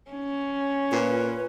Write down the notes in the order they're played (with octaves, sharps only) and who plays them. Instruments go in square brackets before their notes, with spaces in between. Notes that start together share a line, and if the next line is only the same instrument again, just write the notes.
[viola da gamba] C#4
[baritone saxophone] A#2 [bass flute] B4